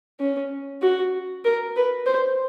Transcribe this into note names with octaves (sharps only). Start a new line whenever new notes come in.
C#4
F#4
A#4
B4
C5